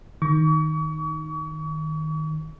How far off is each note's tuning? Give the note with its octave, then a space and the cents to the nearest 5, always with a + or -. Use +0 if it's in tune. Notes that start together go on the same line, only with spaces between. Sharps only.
D#3 +0 C#6 +40